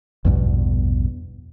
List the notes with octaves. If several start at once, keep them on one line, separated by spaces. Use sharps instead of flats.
A#1 E2 G2 B2